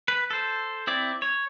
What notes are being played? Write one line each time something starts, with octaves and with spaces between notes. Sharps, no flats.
B4
A4 C5
C4 E4 D5
C#5